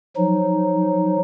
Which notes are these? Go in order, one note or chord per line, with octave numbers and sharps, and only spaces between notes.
F3 F#3 D#4